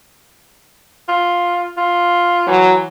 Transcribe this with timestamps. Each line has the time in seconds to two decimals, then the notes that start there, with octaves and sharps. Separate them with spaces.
1.08 F4
1.77 F4
2.47 E3 F#3